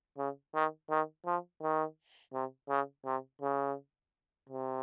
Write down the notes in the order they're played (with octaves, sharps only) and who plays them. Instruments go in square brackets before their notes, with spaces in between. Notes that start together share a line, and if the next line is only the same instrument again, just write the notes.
[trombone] C#3
D#3
D#3
F3
D#3
C3
C#3
C3
C#3
C3